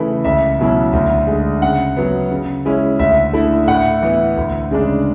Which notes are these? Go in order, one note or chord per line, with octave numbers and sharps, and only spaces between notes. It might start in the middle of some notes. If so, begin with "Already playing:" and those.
Already playing: C#3 E3 A3 E4
C#2 E5
B2 F#3 C#4 E4
D2
D3 G#3
C#3 F#5
F#3 B3
C#3
G#3 C#4 E4
D2 E5
D3 A3 E4
A2 F#5
E3 B3 E4
D2
C#3 G#3 D4